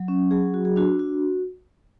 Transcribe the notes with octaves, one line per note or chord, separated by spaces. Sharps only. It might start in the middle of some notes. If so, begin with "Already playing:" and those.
Already playing: F#3
C#4
F#3 G#4
F#4
G#4
D4 F#4
F#4